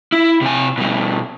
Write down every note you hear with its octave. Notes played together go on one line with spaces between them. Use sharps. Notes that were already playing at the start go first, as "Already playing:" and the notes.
E4
C3 G#5
B2 G3